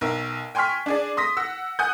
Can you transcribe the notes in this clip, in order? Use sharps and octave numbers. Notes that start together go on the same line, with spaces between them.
B1 A#4 E5
G5 G#5 C6 C#6 F6 B6
D4 G#4 D5
C6 D#6 A#6 B6
F#5 E6
F#5 G#5 D#6 F#6 G6